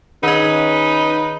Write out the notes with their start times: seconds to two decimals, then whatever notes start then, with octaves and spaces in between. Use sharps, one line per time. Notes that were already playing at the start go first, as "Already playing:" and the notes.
0.23 D#3 C#4 D#4 B4 D#5